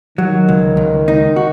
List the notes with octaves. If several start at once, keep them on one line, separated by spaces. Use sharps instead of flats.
D#3 F#3
C#2
C#2
D#4
F#4